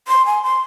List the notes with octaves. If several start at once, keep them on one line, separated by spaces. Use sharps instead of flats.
C6
G#5
C6